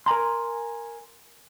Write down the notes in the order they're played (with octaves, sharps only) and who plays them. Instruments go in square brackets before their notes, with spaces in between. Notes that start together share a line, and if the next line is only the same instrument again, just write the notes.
[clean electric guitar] A#4 G#5 A#5 C6